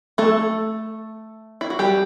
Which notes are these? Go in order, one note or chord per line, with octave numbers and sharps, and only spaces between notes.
A3 A4
E4
F#4
G3 G4